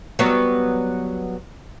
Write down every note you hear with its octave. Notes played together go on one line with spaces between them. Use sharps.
F#3 G3 B3